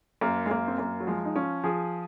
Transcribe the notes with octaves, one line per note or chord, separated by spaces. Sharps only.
F#2 A#3
G#3
F#2 A#3
C4
F#2 A#3
F#3
F3 G#3
D#4
F3 C#4
F3 G#4